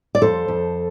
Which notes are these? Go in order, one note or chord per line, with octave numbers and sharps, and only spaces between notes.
D5
F2 A4 C5
F2